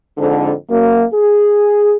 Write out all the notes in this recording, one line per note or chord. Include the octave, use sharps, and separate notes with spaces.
F2 G#2 D3
F#2 A#3
G#4